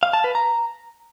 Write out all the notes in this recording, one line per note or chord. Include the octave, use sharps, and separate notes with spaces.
F5
A5
B4
A#5